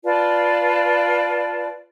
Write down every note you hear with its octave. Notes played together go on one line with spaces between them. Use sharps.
F4 B4 D5 A5